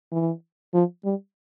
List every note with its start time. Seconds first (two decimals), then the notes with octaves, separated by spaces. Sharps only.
0.12 E3
0.74 F3
1.05 G3